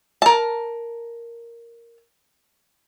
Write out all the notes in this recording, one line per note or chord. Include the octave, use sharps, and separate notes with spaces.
A#4 A5